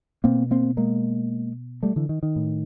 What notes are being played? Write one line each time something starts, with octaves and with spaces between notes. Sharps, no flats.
B2 A#3 C4
A#3 C4
G#3 A#3
G3 A3
D3 E3
D#3
D#3
A2